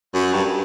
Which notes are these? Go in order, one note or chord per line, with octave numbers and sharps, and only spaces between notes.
F#2
G2